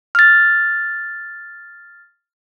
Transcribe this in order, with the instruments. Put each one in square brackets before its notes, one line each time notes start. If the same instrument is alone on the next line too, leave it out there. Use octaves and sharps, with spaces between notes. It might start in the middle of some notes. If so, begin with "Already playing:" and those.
[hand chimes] F6 A6